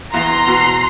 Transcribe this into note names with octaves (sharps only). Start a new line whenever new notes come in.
E2 A#5 C6
B2